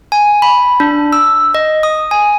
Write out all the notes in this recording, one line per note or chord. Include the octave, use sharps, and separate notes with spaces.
G#5
B5
D4
E6
D#5
D#6
G#5